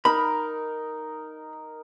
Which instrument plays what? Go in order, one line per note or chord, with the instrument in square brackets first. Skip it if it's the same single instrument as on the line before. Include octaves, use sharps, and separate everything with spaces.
[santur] D#4 A#4 [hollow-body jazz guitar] B5